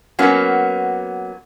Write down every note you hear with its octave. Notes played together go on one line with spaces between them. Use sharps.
F#3 A#3 B3 C#4 F#4